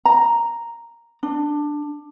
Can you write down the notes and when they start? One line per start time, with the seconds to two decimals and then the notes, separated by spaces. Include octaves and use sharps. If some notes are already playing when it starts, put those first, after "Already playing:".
0.05 A#5
1.23 D4